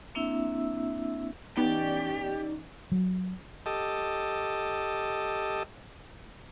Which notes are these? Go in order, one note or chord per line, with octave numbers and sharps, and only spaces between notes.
A#3 C4 D4 E4 E5 E6
E3 B3 C#4 D#4 G4 D5
F#3
G4 A4 D#5